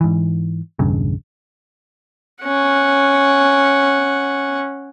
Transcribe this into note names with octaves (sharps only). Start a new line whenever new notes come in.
G#2 E3
B1 E2 G2 C#3
C#4 F#5